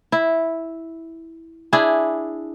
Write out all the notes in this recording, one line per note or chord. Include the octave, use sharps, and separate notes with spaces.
E4
D4 E4 G#4